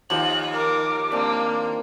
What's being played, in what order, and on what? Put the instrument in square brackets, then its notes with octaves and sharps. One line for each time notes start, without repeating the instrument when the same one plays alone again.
[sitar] D#2 [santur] F3 G4 D#5 [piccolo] F#7
[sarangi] A#4 [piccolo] D6
[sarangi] A#3 [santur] C4 D4